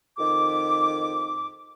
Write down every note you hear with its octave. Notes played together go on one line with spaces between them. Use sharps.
F2 D#3 D6